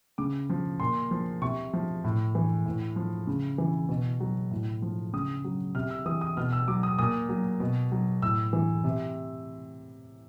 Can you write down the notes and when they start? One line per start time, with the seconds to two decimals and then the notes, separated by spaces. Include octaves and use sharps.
0.18 C#3 D6
0.50 F3
0.80 A#2 C6
1.11 F3
1.42 C3 C#6
1.73 F3
2.04 A2
2.35 E3
2.66 A2
2.96 F3
3.27 C#3
3.58 E3
3.89 B2
4.20 F#3
4.51 A2
4.82 F3
5.13 C#3 D#6
5.44 F#3
5.75 C3 F6
5.91 E6
6.06 E3 D#6
6.21 D#6
6.37 B2 F6
6.53 E6
6.68 F#3 D6
6.83 D#6
6.99 A#2 D#6
7.29 F#3
7.60 B2
7.92 F#3
8.22 A2 E6
8.53 E3
8.84 C3